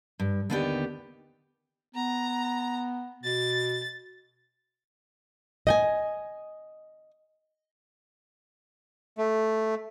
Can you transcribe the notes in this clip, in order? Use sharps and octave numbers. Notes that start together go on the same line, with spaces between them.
G2
D#2 D3 B3 D#4 G4 D5
B3 A#5
B2 A6
D#5 G5 G#5
A3